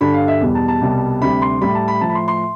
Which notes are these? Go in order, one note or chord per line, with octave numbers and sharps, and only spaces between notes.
G2 D3 G3 B5
F5
E5
E2 B2 G3
A5
A5
C2 B2 G3
D2 C3 G3 B5
C6
A2 G3 B5
A5
B5
A2 F3 A5
B5
C6
C6